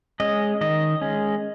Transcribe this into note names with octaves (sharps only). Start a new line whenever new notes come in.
G#3 C#4 D#5
D#3 D#5
G#3 C#4